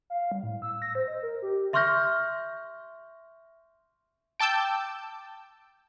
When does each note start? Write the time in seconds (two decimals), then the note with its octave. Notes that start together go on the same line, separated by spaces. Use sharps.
0.10 F5
0.32 G3
0.43 A2
0.62 E6
0.82 A#6
0.95 C5
1.08 D#5
1.23 A#4
1.42 G4
1.73 E5 C6 C#6 F6 G6 A#6
4.40 G5 A5 D6 E6 G6